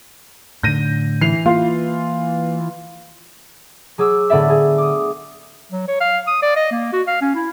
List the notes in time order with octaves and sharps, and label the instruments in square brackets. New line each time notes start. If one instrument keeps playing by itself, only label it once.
[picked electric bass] A2 D3 [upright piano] G6 A#6 D#7
[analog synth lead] E3 [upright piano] C7 F7
[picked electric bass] A#3 [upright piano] F4
[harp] F#3 G#4 D6 E6
A2 D3 B3 D5 E5
G#4
D6 D#6
[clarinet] F#3
C#5
F5
D#6
D5
D#5
A#3
F#4
F5
C#4
E4